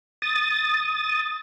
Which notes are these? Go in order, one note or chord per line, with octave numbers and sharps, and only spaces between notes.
D#6 A6